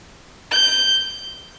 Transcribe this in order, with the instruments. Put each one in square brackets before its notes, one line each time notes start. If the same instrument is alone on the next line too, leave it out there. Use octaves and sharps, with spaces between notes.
[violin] G6